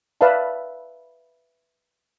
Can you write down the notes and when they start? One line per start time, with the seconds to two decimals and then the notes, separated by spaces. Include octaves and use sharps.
0.21 B4 D5 E5 F5 A5